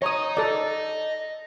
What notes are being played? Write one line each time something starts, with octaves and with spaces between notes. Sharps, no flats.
C#5 D#5 A#5 D#6
A4 D5